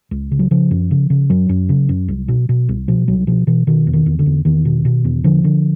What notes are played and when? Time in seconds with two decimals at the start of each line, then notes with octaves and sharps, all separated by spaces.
0.11 C#2
0.31 C#3
0.39 F#3
0.51 C#3 F3
0.71 F#2
0.91 C#3
1.10 C#3
1.30 F#2 F#3
1.49 F#2
1.69 C#3
1.89 F#2
2.08 C2
2.28 B2
2.49 B2
2.69 C2
2.88 B2 F3
3.08 C2 F#3
3.27 B2 F3
3.47 B2 E3
3.67 B2 D#3
3.87 E2
3.93 D#3
4.06 E2
4.19 D3
4.26 E2
4.45 E2 D#3
4.65 B2
4.85 B2
5.04 E2
5.24 D3 F3
5.44 D3